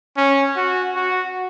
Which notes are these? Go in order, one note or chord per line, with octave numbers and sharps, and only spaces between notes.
C#4
F#4
F#4